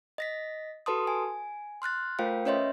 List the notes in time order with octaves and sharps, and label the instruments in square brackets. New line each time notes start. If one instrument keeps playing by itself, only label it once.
[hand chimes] D#5 A#6 B6
F#4 A4 B4 A5 C6 D#6
G#5
C6 F6 F#6 A6
A3 F4 A#4 C5 F5 G5
C#4 B4 C#5 D#5 E5 C6